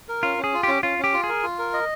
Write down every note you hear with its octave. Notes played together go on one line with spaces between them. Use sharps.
A#4
C#4 F4
C#4
G#4
F4
C#4 G4
C#4 F4
C#4 G4
F4
G#4
A#4
F4
A#4
D#5